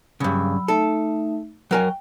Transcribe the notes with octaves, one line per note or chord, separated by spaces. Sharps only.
G2 C#3 F#3 B5 E6
A3 D#4 A4 E5
F#3 A#4 G5 G#5